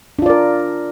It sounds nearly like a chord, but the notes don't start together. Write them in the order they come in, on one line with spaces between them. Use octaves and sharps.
D4 F4 D5 A#4